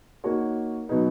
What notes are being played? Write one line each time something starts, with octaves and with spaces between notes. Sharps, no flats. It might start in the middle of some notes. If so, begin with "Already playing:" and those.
A#3 D#4 F#4 C#5
B2 F#3 B3 D#4